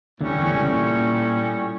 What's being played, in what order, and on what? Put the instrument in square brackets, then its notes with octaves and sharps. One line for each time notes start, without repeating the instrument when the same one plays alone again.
[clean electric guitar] D2 D3 [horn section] A2 G3 C#4
[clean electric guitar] E2 E3
C#2 C#3
A#2